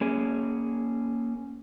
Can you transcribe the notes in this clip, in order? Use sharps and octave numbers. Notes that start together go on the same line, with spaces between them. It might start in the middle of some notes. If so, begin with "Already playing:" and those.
A#3 C#4 G#4